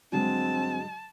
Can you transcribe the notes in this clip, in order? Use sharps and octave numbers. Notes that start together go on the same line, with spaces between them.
G2 D3 F#3 G#3 C4 A5